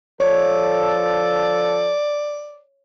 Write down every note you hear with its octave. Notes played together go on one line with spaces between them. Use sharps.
F3 A4 C#5 D5